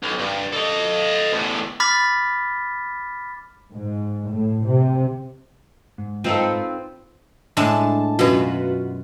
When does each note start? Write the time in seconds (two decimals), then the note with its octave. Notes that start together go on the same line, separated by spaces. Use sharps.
0.03 B1
0.19 G2
0.53 A4 D#5
1.33 E2 A2
1.80 B5 D6 F6 A6 B6
3.73 G#2
4.32 A2
4.68 C3
5.98 G#2
6.24 C4 D#4 F4 A4 B4 C5
7.57 A2 G#3 D4 A5
8.19 F#2 B2 F4 F#4 B4